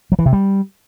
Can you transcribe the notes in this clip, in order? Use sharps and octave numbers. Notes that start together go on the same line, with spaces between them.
F#3
E3
C3
G3